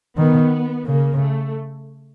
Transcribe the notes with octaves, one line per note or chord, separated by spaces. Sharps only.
D#3 B3
C#3 A#3
A3